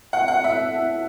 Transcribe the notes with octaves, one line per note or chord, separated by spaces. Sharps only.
F#5
F#5
E5